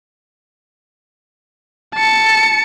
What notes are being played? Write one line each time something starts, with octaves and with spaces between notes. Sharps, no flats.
A5 C#7